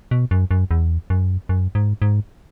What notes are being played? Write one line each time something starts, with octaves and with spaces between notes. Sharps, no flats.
B2
F#2
F#2
E2
F#2
F#2
G#2
G#2